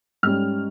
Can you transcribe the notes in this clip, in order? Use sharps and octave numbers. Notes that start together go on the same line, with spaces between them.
G#2 G3 C#4 F6